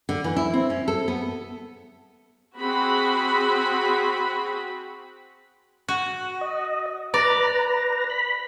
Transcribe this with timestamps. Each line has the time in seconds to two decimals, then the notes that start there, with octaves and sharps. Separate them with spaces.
0.09 D3
0.24 E3
0.36 E4
0.54 C4
0.70 C#4
0.88 A4
1.08 B3
2.58 C4 F#4 G#4 B5
5.88 F#4
6.41 D#5
7.14 B4 D5 A#5
8.10 B5